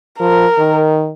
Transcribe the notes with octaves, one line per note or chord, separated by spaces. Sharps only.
F3 A#4
D#3